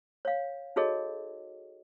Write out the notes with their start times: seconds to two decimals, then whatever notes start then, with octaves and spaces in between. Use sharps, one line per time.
0.25 C#5 F5
0.76 D#4 F#4 G#4 A4 C#5 D#5